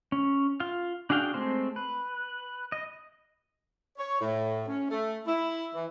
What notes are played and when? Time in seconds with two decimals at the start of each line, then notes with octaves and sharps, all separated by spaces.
0.12 C#4
0.60 F4 F5
1.10 D4 F#4 G#4 F5 G5
1.34 G#3 A3 C4 C5
1.76 B4
2.72 D#5
3.98 C#5
4.21 A2
4.68 C#4
4.90 A3
5.26 E4
5.74 E3